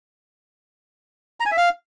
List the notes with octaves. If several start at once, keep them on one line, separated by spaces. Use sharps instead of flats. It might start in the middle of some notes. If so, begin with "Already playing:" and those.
A#5
G#5
E5
F5